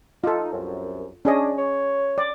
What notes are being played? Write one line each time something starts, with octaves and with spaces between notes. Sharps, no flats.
D#4 F4 A4
C2 F#2
C#4 D4 G#4 D#5
C#5
D5